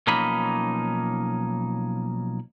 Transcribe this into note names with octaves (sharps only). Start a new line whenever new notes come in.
B1 F3 A#3 C#4 D#4 B5